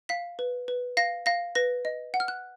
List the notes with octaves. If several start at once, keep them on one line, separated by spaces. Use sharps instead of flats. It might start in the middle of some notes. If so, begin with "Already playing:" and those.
F5 B6
B4
B4
F5 A#6
F5 A#6
B4 A#6
D#5
F#5
F6
F#6